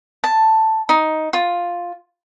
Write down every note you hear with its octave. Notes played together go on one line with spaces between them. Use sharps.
A5
D#4
F4